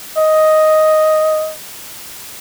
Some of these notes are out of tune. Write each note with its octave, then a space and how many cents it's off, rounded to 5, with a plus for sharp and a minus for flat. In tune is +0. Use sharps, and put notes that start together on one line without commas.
D#5 +5